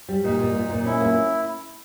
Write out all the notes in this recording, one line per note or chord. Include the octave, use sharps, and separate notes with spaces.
G3
A#2 D#4
A#2
A#2
A#2
C#4 E4
A#3